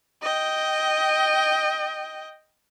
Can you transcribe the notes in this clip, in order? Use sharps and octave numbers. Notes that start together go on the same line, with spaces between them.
D#5 G5